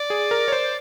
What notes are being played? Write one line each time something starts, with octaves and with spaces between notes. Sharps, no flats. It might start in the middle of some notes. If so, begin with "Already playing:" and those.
Already playing: D5
G#4
A#4
C#5
C5